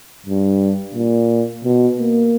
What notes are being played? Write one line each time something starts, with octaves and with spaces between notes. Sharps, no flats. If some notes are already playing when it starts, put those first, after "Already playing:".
G2
A#2
B2
A#3